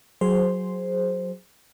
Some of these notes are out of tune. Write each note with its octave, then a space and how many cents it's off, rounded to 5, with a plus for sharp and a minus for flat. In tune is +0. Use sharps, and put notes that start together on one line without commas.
F#3 +0 G#4 +0 C5 +0